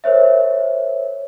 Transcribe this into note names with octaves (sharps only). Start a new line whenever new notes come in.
A#4 C5 C#5 E5